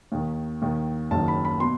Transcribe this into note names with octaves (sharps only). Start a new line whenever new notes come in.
D#2 D#3
D#2 D#3
F#1 F#2 D#3 A5
B5
B5
B2 C6